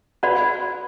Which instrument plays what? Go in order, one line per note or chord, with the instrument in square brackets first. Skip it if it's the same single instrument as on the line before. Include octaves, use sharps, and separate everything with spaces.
[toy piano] F#4 D5 F#5 B5 [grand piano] B4